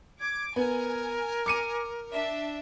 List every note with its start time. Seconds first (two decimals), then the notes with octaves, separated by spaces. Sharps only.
0.20 D6 G#6
0.56 B3 A#4 G#5
1.46 D6 C#7 D#7
2.12 D4 E5